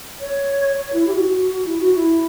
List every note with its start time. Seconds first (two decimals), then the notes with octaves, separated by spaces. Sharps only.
0.20 C#5
0.78 C#5
0.93 E4
1.07 G4
1.12 F#4
1.65 E4
1.79 F#4
1.94 E4